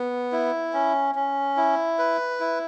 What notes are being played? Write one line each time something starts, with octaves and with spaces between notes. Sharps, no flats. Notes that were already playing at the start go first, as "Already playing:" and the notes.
Already playing: B3
E4
C#4
C#4
E4
B4
E4